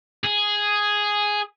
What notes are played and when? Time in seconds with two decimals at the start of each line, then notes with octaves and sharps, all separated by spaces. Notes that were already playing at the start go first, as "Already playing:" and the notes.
0.25 G#4